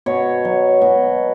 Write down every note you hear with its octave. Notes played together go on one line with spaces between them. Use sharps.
B2 C#5
F#3
B2